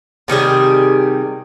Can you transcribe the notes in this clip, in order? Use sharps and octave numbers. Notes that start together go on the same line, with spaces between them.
C3 D#3 G3 G#4